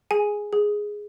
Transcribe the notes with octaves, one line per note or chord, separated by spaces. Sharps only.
G#4 G#5
G#4